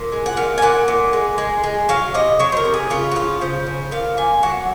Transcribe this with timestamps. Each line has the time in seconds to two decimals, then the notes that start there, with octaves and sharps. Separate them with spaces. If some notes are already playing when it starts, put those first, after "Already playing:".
Already playing: A#2
0.12 G#3
0.26 F#5
0.37 A#2 F5
0.58 G#5
0.62 A#2 F#5
0.88 A#2
1.13 G#3
1.38 G#3
1.64 G#3
1.89 F#3 F5
2.14 C3 D#5
2.39 F#3 C#5
2.52 C5
2.57 A#4
2.65 C3
2.74 G#4
2.90 C#3 F4
3.12 F#4
3.15 F3 F4
3.41 C#3 C5
3.67 C#3
3.91 A#2 F5
4.17 A#2 G#5
4.43 F#3 F#5